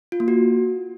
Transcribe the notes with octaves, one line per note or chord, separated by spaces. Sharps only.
F4
A#3
F#4